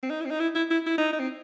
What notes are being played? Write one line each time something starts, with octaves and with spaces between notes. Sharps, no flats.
C4
D#4
E4
C4
D#4
E4
E4
E4
E4
D#4
D#4
C4